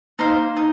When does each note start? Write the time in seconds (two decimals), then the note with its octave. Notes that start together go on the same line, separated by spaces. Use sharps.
0.19 A#3 D#4 C5 F5
0.57 D#4